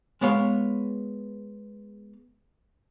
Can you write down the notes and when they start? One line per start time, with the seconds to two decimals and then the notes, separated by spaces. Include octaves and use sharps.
0.21 G#3 B3 C#5 F5